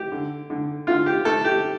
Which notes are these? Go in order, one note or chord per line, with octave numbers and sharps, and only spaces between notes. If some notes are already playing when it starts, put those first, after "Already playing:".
Already playing: G4
D3
D3
D3 F4
G4
A3 A4
G4